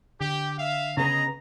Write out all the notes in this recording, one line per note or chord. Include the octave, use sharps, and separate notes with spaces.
D3 G4
E5 F5
C#3 B3 G#4 D#5 A#5